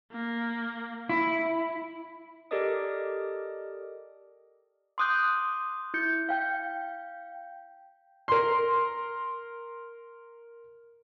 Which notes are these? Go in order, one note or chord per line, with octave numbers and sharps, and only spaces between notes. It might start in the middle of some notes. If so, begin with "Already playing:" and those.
A#3
E4
G4 A4 A#4 D5 D#5 D#6
C6 D6 D#6 F#6 G6
E4 G6 C#7
F5 G5 G6
A#4 C6